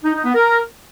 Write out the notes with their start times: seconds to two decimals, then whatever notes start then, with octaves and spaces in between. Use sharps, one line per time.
0.04 D#4
0.14 D#4
0.25 B3
0.35 A#4